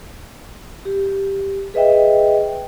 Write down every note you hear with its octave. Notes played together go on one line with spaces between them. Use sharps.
G4
G#4 B4 D#5 E5 G5